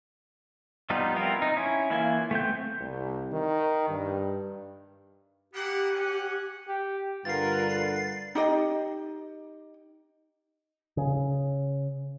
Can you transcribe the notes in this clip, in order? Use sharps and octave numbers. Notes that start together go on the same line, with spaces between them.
F3 G3 B3 D#4 F4
B3 C4 E4 F4 A#4
D#4
C#4 E4
E3 A#3 E4 F4 G#5
A3 B3 C4 G6
C2
D#3
G2
A#3 B3 G4 F#5
C#4 F#5
G4
G2 D3 F4 A#4 B4 F#5 A6 C7
D#4 G4 D#5
C#3